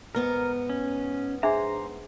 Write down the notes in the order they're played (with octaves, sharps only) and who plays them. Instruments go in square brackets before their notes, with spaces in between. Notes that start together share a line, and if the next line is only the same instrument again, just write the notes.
[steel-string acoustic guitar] G#2 B3 F#5 [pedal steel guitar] A#4
[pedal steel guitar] C#4
[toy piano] D4 G#4 E5 [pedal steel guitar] C5 A#5